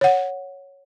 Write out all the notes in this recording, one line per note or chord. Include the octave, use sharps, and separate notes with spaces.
C#5 F#5